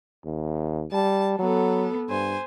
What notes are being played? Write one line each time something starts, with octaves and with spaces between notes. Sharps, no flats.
D#2
G3 A5
F#3 B3 A4
G2 C5 G#5